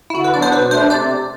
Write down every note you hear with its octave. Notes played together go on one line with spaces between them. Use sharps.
E4
D3 F#4
B4
F#3 B3 D4 D5
C5
B2 B4
A3 D4 C5
C3 D5